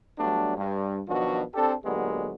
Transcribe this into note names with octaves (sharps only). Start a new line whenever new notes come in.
F#3 G3 A3 B3 D4
G2
B2 D#3 F3 F#3 D4 F#4
C4 D4 G4 A4
A#2 D3 F#3 G#3 B3 G4